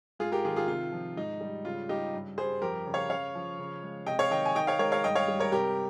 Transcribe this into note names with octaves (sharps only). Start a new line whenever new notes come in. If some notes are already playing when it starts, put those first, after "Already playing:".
G#2 F4 G#4
G4 A#4
D#3 F4 G#4
F4 G#4
C3 F4
F3
G#2 D#4
G3
C#3 F4
G3 D#4 G4
G2
G3 G#4 C5
F2 G4 A#4
C#3
C#5 F5
C#3 C#5 F5
F3
C#3
G#3
C3 D#5 G5
C#5 F5
D#3 D#5 G5
G#5
D#3 D#5 G5
C#5 F5
G#3 A#4 C#5
C#5 F5
G2 D#5 G5
C#5 F5
G3
A#4 C#5
C3 G4 A#4